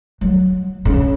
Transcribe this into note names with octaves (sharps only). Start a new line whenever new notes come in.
F#3
C#3